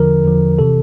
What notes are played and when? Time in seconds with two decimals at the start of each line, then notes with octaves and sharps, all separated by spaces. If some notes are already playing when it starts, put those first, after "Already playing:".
Already playing: E2 D3 F3 A#4
0.25 E2 D3 F3
0.59 C3 E3 A4